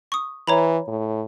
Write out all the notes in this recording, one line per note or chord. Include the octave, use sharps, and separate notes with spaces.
C#6 D#6
E3 C#5 A#5 B5
A2